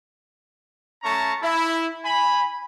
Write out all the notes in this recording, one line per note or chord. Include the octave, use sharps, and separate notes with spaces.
A3 C#4 A5 A#5 C#6
E4
G#5 B5